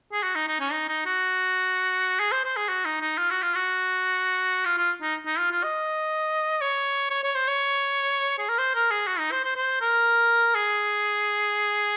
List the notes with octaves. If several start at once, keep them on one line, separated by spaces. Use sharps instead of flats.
G#4
F#4
D#4
D#4
C#4
D#4
D#4
F#4
G#4
C5
C5
G#4
F#4
D#4
D#4
F4
F#4
F4
F#4
F4
F4
D#4
D#4
F4
F4
D#5
C#5
C#5
C#5
C5
C#5
G#4
A#4
C5
A#4
G#4
F#4
D#4
C5
C5
C5
A#4
G#4